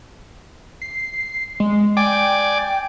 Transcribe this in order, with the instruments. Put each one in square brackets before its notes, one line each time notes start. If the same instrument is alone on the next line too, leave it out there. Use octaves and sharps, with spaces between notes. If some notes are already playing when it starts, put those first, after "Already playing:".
[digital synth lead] C7
G#3
[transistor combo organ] D5 G#5 D6 [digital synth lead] G5